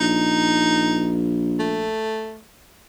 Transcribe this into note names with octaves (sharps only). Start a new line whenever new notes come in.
A#1 D#4
A3